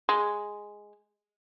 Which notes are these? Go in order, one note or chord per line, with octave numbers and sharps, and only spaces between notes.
G#3